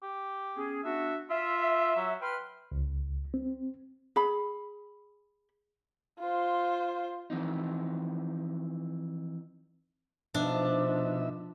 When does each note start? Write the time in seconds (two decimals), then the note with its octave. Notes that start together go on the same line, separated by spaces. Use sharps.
0.03 G4
0.56 B3 C#4 G#4
0.84 B3 D4 F#4 E5
1.30 F4 E5
1.96 F#3
2.22 B4 G5 C6 F6
2.72 C#2
3.34 C4
4.16 G#4 B5
6.19 F4 C5
7.30 E3 F3 C4 D#4
10.34 B2 F3 D4 D#4 E5